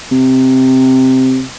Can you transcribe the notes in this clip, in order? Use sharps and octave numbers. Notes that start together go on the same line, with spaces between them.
C3